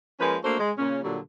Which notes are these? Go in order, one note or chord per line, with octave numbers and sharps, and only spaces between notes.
F3 G#3 A#3 C#4 B4
A3 A#3 D4 F#4 A4 C5
G#3
A#2 C#3 C#4
A#2 D3 F#3 G3